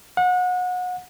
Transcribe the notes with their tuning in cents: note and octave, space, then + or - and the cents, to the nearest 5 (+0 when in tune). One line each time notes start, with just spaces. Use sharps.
F#5 -30